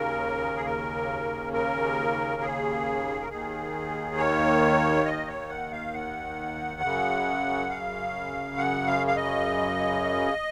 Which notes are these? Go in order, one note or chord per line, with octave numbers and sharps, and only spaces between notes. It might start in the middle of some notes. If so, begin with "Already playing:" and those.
Already playing: D#2 C#3 A#4
G#4
A#4
A#4
G#4
A#4
D#2 D#3 G#4
C#5
D#5
C#5
F#5
F5
F#5
F#2 C#3
F5
F#5
F5
F5
D#5